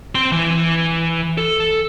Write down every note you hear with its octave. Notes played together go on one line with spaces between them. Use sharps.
C4 C6
E3
A4